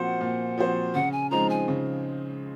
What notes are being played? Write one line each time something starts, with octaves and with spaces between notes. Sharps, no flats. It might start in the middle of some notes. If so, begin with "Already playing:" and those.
Already playing: A#2 F3 C4 F#4 C5 F#5
A#2
F3 C4 F#4 C5
C#3 F#5
G#5
F3 G#3 C4 D#4 A#5
G#5
C#3